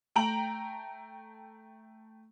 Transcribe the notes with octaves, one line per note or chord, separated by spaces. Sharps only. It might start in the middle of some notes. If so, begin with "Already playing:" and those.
A3 G5 A#5 F#7